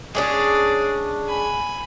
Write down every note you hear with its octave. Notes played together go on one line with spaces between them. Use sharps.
G#3 C#4 D4 G#4 D5
G#5 B5